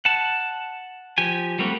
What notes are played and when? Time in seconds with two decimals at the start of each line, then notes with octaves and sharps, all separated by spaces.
0.05 F#5 A5
1.18 F3 G4 G#5
1.59 G3 A3 A#3 C4 F#4